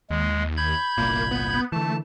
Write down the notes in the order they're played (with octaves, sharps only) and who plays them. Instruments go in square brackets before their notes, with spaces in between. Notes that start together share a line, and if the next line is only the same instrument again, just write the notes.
[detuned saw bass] D#2 [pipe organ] G#3
[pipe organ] B5 G6 G#6
[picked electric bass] G1 C2 A#2 [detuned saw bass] A#3
[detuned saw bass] B3
[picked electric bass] D3 E3 [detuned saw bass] A3 [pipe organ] A5